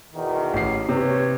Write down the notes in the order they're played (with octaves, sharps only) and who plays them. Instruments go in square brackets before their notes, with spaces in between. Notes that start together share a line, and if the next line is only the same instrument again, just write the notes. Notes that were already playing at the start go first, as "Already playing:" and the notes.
[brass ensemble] E2 B2 D#3
[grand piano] A1 C7
[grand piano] C3 [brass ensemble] B4 C#5